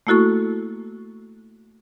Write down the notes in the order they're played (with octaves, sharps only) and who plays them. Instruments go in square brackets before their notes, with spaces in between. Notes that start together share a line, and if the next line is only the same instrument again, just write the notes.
[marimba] A3 A#3 E4 F#4 A4 C#6